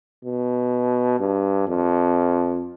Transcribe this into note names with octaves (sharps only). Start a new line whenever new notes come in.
B2
G2
F2